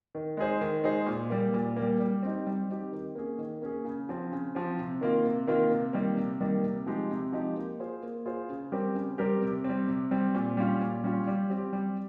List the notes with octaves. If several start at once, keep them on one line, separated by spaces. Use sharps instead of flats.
D#3
G#3 D#4 G#4 C5
D#3
G#3 D#4 G#4 C5
A#2
G3 A#3
A#2
A#3
G3
G3
C4 D#4 G4
G3
C4 D#4 G4
D#3
A#3 C#4 G#4
D#3
A#3 C#4 G#4
C#3
F3 C4
C#3
F3 C4
C3
D#3 A#3 F4
C3
D#3 A#3 F4
C3
D#3 G3 A#3
C3
D#3 G3 A#3
C3
F3 G#3 D#4 G4
C3
F3 G#3 D#4 G4
A#3
F4 G#4 C5
A#3
F4 G#4 C5
C#3
G3 C4 G4 A#4
C#3
G3 C4 G4 A#4
C3
G3 C4
C3
G3 C4
A#2
G3 C#4 F4
A#2
G3 C#4 F4
G3
C4 G4
G3